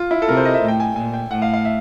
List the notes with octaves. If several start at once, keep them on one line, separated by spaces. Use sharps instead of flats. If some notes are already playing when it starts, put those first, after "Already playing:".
Already playing: F4
E4
A4
C3 A#4
C5
D#5
E5
A2
G5
G#5
A#2 G#5
G5
A2 F#5
F5
F5
E5